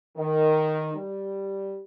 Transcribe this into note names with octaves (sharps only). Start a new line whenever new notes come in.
D#3
G3